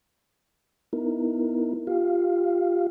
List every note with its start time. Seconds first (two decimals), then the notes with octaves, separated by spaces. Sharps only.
0.93 B3 D#4 E4 A#4
1.87 F4 G4 F5